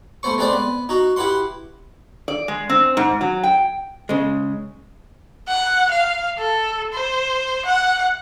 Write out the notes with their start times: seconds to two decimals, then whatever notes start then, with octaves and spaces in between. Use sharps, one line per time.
0.23 A3 B3 C5 C#6
0.38 G#3 A3 C4 B4 C5 D5
0.53 B3
0.89 D#4 F#4
1.16 E4 G4 B4 F#5 C6
2.28 D5
2.48 G#3
2.69 C4
2.97 G#2
3.21 F#3
3.43 G5
4.09 C#3 G#3
5.48 F#5
5.92 F5
6.39 A4
6.93 C5
7.65 F#5